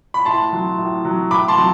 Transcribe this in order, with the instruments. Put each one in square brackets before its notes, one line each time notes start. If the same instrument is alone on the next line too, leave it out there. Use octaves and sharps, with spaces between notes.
[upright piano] B5
A2 A5 C6
F#3
A2
F#3
A2 B5 D6
A5 C6
F#3